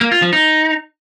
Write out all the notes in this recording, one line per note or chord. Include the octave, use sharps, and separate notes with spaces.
A#3
F4
F3
D#4